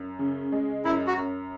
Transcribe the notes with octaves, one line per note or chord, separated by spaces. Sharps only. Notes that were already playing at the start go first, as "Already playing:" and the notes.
Already playing: F#2
C#3
G#3
F#2 E4
F#4
F#2